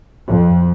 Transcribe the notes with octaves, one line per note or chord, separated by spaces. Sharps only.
F2